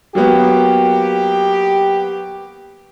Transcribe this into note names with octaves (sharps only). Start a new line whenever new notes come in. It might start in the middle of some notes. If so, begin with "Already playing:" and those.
F#3 A#3 B3 G4